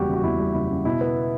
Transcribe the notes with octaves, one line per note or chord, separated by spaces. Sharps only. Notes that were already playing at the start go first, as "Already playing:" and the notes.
Already playing: F#1 E2 G3 F#4 G4
C#3
F#4
E2 E4
G3
F#1 E4
C#3
B2 E4
B3